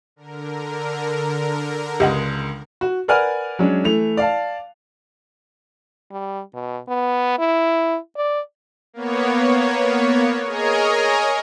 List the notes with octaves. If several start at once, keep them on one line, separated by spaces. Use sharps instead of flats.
D3 A#4
C#2 G#3 G4 D#5 F#5
F#4
A#4 B4 D5 F#5 G#5 F6
F#3 G#3 C#4 D4
E3 A3 F7
D5 F5 A5
G3
B2
B3
E4
D5
A#3 B3 C#5
G#4 A#4 C#5 D#5 G#5 A#5